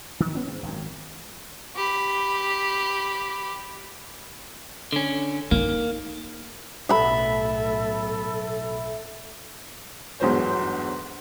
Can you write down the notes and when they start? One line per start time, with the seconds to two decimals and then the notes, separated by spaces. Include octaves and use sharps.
0.20 D#3
0.35 B3 C#4
0.47 G#2
0.63 G#1 F#2
1.75 G4 B5
4.92 D3 C#4
5.51 A#3 D#4
6.89 B1 A2 A4 E5 B5
10.20 G1 E2 G#2 F#3 C5 C#5